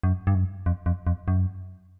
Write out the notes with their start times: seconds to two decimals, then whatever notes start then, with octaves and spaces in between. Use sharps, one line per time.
0.03 F#2
0.27 G2
0.35 F#2
0.66 F2
0.86 F2
1.07 F2
1.28 F#2